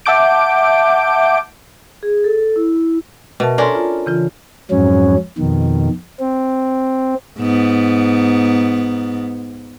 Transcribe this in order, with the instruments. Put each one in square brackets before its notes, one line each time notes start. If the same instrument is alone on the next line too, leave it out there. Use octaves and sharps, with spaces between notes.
[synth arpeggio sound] E5 F#5 A5 D6 G6 D7
[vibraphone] G#4
A4
E4
[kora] B2 [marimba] A#4 E5 A5
[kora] C#4 D4 A#4 [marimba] A4 C6
[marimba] F4
C#3 E3 F4
[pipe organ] F2 G#2 F#3 C#4
F2 B2 D#3
C4
[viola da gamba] G#2 B3